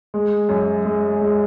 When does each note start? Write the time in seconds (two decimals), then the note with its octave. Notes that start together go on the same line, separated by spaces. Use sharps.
0.14 G#3
0.49 F#2
0.85 G#3
1.21 G#3